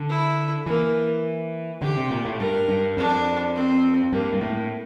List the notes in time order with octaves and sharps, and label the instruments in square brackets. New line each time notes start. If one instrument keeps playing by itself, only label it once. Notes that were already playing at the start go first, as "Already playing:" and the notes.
Already playing: [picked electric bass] D3
[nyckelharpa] E4
[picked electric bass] E3 [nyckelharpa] A#3
[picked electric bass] D3 [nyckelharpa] G4
[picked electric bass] C3
A#2
A2
[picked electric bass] G2 [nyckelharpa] A#4
[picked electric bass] G2
[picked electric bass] F2 [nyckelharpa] D4
[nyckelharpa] C4
[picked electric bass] G2 [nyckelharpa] A#3
[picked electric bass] G2
[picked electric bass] A2 [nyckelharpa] A#3